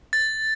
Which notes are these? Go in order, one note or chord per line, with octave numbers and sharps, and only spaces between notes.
A6